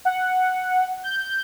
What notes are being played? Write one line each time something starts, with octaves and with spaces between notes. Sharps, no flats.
F#5
G6